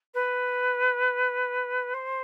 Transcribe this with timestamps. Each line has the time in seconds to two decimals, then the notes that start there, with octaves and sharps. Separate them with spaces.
0.14 B4
1.93 C5